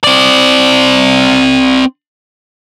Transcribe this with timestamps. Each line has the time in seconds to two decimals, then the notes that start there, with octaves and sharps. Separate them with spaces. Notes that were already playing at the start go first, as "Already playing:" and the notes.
0.04 C4 D5